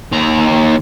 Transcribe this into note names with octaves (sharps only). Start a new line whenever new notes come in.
D#2 A#5